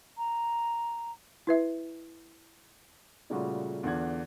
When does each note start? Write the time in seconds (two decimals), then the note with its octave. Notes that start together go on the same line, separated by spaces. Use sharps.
0.18 A#5
1.47 E4 B4 E5
3.30 A#2 C#3 G3 A3 F4 F#4
3.83 E2 D3 D4 F4 F#5 G#6